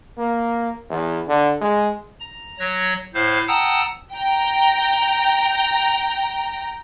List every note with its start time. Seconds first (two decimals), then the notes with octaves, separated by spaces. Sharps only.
0.18 A#3
0.90 E2
1.28 D3
1.61 G#3
2.20 A#5
2.59 F#3 C#5 F#6 A#6
3.14 A2 C5 F5 F#6
3.48 F#5 G5 A5 A#5 D#6 E6
4.13 G5 A#5